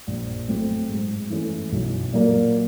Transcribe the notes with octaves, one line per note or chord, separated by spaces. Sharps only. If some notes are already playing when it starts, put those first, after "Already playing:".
A#1
A2 F#3 A3 C4
G#2
E3 A3 C#4
B1
A#2 F#3 A#3